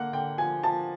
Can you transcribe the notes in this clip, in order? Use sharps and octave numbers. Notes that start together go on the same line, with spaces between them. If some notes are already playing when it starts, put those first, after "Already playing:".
Already playing: D3 A#3 F#5
D3 G5
F3 G#5
F3 A5